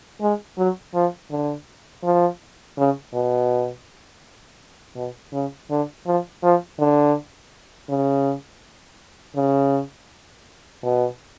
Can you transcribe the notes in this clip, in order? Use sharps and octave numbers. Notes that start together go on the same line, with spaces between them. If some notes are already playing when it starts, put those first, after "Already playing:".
G#3
F#3
F3
D3
F3
C#3
B2
B2
C#3
D3
F3
F3
D3
C#3
C#3
B2